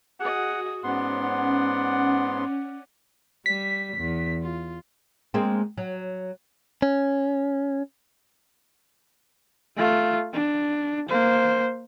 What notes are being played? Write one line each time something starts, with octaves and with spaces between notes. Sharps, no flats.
F#4 G#4 D#5 F#5
G#2 B3 C#4 D5 F#5 C6
G3 B6
E2
F4
G#3 A#3 C4
F#3
C#4
A3 F4
D4
A#3 C5